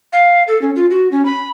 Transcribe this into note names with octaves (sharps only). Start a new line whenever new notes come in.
F5
A4
C#4
F4
F#4
C#4
B5